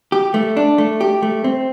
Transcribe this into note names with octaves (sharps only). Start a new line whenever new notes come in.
G4
A3
D4
A3
G4
A3
C4